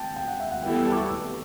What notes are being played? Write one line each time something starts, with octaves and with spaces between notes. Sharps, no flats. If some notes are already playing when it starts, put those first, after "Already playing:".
Already playing: G5 A5
G5
F#5
E5
F#5
E3 G3 B3 E4 A4 G5
G5
A5
D6
C#6
E6